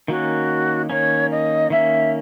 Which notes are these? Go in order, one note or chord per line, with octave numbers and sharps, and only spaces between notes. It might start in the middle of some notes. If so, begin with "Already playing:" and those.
D#3 A#3 C#4 F#4
D#3 A#3 C#4 C#5
D#5
D#3 A#3 C#4 E5